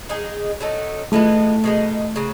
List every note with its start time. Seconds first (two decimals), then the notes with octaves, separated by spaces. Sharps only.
0.09 G#3 D#4 G#4
0.61 F#3 A3 D#4 A4
1.12 E3 G#3 A3 B3
1.64 B2 G#3 D#4
2.16 C#3 F#3